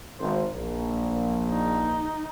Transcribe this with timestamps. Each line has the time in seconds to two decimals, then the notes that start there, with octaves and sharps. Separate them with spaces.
0.19 G#1 C5
0.53 A#1
1.52 D#4